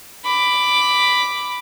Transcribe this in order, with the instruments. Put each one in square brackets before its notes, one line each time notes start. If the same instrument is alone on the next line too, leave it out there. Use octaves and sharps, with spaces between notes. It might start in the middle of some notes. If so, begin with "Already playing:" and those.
[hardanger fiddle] B5 D6